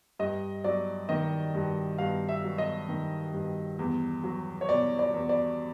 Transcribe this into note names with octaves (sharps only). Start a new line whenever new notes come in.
G2 D#5
F#3 D5
D#3 D#5
G2
G2 F5
E5
F#3
D#5
D#3
G2
E2
F#3
C#5
B2 D5
D5
E2
D5